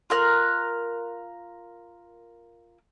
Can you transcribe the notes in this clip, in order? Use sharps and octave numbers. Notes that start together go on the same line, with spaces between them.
F4 A#4 F#6